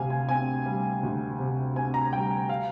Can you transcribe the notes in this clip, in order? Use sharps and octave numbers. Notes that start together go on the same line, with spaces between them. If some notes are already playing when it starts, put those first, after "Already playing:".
Already playing: D2 C3 F5 G#5
G#5
C4 G#5
G3
D2
C3
C4 G#5
A#5
G3 G5
F5